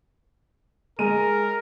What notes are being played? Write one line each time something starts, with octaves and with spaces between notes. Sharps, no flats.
G#3 A#4 D#7